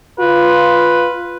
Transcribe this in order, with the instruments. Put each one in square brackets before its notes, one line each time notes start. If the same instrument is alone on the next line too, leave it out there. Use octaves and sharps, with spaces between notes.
[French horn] F4 [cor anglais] B4